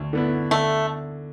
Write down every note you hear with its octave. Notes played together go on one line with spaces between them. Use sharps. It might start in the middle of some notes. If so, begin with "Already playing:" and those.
Already playing: D2
D3 B3 E4
D3 A3